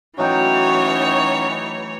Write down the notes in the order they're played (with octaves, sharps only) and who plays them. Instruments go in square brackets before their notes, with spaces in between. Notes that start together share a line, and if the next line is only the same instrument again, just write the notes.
[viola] E3 C#5 [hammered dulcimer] F#3 A3 G5 [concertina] C#4 D#4 F#4